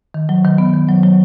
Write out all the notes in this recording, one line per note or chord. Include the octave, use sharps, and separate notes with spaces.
D#3
F#3
D#3
B3
D#3
F#3
F#3